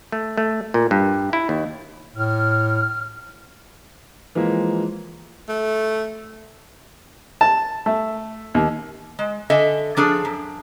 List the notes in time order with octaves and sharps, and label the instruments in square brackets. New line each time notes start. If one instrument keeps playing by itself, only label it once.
[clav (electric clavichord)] A3
A3
A#2
G2
E4
D#2
[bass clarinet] A2 [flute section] F6
[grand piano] E3 F3 G#3 A#3
[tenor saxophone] A3
[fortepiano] A5
A3
D#2
[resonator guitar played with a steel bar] G#3
D3 A4 D#5 E5 G#5
F3 D4 G#4 A4
F#2